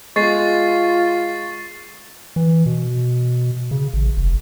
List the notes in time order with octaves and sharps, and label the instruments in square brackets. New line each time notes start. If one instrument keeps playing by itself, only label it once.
[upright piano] G#3 [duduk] F4 [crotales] C#6 A6 C7
[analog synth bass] E3
B2
C#3
A1
F1